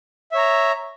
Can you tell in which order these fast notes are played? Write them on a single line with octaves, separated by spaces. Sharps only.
E5 C#5 A#5